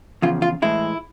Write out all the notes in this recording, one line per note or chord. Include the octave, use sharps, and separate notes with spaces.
E2 C#3 F3 F4
F4
A2 E3 G#3 E4